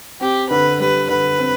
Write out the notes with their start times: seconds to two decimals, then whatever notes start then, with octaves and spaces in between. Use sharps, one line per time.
0.21 C4 G4
0.50 D3 B4
0.80 G3 B4
1.09 D3 B4
1.39 C4